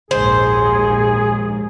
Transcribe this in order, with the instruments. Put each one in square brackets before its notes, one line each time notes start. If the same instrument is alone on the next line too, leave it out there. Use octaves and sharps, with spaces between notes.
[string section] A#1 D#2 G#2 [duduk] G#4 [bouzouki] C5